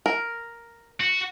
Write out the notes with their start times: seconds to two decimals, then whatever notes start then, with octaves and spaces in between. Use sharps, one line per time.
0.06 A#4
1.00 F#4